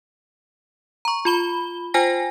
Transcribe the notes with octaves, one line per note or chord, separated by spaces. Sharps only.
A#5 C#6
F4 B5 G7
F4 C5 G5 G#5 A#6